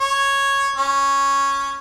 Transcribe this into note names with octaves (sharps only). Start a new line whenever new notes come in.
C#5
C#4